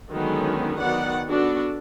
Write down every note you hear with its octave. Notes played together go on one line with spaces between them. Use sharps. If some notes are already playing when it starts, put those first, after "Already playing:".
D3 D#3 F#3 G#3 B3 C#4
D#3 F#3 B3 D5 F#5
B3 D4 F#4 A4